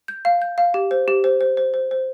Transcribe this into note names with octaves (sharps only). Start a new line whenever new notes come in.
G6
F5
G6
F5
G4
C5
G4
C5
C5
C5
C5
C5